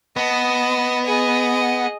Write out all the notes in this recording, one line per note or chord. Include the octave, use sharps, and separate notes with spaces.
B3 D#5 A5
G#4 D#5